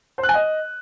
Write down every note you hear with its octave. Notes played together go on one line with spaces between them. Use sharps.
C5
F#6
G#5
D#5